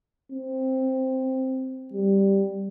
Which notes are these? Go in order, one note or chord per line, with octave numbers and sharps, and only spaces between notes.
C4
G3